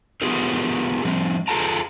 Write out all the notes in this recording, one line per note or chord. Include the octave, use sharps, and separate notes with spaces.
B3 F4 G4 G#4 A#4
F3 G3 C4
F4 G#4 A4 G5 A5 A#5